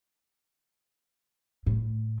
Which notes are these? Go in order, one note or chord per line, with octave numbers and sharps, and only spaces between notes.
A2